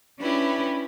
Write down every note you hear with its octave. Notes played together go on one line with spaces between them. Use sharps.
C#4 D4 E4 G4 B4